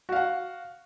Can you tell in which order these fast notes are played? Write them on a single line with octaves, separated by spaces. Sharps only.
F#4 F5 F#5